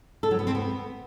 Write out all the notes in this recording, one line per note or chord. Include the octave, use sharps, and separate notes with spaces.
A4
F#3
B3
C4
B3